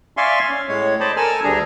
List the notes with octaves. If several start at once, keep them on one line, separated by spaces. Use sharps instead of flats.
D5 E5 F5 G#5 C6 C#6
C#4
A2 G#3 C#5
C5 D5 D#5 A5 B5
A4 A#4 G#5 E6 F6
D2 G3 D4 G#4 A#5